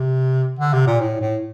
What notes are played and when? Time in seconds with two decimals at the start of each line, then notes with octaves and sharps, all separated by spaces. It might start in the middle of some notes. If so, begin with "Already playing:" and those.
Already playing: C3
0.59 D3
0.73 C3
0.87 A#2
1.01 A2
1.21 A2